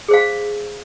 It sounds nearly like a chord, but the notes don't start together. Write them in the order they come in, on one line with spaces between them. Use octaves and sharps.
G#4 C5 F5